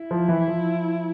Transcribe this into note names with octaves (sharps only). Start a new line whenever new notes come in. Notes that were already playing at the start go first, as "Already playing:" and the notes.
Already playing: E4
F3
E3
F3